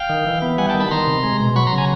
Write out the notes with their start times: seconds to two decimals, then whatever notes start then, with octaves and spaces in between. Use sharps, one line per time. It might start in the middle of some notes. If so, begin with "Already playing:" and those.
Already playing: F5 G5
0.09 D#3
0.26 E3
0.42 B3
0.58 G3 F#5 G#5
0.69 G5 A5
0.74 D#3
0.80 A5 B5
0.91 D#3 A#5 C6
1.07 C3
1.23 G#3
1.40 B2
1.56 F#3 B5 C#6
1.67 A#5 C6
1.72 C#3
1.77 G#5 A#5